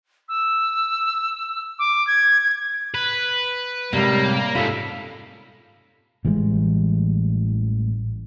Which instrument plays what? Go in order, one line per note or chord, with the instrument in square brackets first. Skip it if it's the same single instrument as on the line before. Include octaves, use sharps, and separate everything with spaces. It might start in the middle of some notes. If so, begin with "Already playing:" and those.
[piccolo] E6
D6
G#6
[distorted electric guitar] B4
[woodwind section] A2 G3 [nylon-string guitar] C3 G#3 [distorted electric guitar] A#3
[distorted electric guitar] G#2 C3 [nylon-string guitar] F4 [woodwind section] A4 B5
[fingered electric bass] A1 E3 G3 G#3